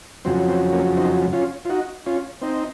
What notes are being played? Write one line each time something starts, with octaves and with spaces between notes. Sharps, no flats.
F2 C#3 F#3 C4
C4
A#3 C#4
C4 D#4
C#4 F4
F4
D#4 F#4
C#4 F4
C4 D#4